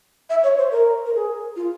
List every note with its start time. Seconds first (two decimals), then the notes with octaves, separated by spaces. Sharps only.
0.30 E5
0.44 C#5
0.58 C5
0.71 A#4
1.06 A#4
1.15 G#4
1.56 F4